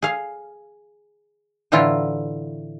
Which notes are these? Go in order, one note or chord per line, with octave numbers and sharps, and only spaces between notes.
G#4 F5
A2 D3 E3 E4 F4 A#5